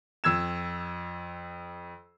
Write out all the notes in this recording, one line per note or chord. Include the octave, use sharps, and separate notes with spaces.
F2 E6 G#6 E7